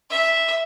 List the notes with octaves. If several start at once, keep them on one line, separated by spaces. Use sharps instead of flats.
E5